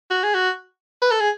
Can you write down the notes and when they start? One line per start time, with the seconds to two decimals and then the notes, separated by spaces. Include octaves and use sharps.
0.10 F#4
0.23 G#4
0.34 F#4
1.02 B4
1.11 A4
1.20 G#4